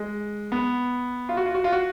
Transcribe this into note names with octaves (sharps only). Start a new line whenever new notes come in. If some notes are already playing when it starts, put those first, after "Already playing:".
Already playing: G#3
B3
F4
F#4
F4
F#4
F4
F#4